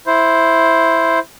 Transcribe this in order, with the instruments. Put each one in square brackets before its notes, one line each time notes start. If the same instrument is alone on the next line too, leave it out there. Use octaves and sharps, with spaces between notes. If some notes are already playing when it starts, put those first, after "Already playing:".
[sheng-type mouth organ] E4 C5